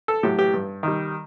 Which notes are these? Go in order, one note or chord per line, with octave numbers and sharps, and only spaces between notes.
A4
A2 F#3 G4
G4
G2
D#3 G3